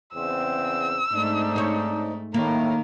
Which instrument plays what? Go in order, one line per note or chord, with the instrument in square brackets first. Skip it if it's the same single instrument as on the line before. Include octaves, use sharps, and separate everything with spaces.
[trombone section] E2 C#3 C4 [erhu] E6
[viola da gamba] G#2 A3 [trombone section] C4 D4 D#4
[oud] C5 C#5
[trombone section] A2 [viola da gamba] D#3 [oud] A#3 [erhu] A#4